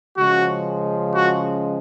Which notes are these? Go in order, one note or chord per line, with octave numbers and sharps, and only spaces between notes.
C#3 F3 G#3 C#4 F#4
F#4